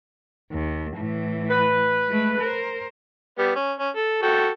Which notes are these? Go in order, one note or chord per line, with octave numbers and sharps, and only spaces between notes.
D#2
A2 E3
B4
G#3 A3
A#4 C5
G3 B3
C#4
C#4
A4
F#4 A4 G5